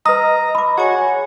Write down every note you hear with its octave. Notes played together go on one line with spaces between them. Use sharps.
B4 D#5 A#5 D#6
B5 D6
F#4 G#4 C#5 G#5